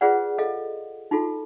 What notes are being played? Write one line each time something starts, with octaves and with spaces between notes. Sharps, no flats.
F4 G#4 B4 C5 D5 F#5
A4 D#5 F5
D#4 F4 F#4 A4